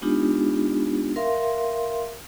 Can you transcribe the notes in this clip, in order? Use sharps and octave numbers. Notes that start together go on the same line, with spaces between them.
G#3 B3 D4 D#4 F4 G4
A#4 E5 F5 C6